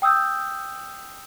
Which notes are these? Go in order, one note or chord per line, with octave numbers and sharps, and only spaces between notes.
G5 D#6 E6 G6